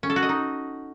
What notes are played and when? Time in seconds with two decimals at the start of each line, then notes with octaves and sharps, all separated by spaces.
0.03 C#4
0.10 A4
0.16 F#4
0.23 D#5
0.29 D#4